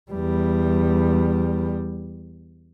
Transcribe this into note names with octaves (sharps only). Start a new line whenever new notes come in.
E2 G3